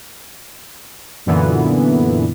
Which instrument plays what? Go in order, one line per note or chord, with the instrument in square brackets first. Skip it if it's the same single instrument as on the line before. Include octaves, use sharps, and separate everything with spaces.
[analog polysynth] F#2 A#2 D3 E3 B3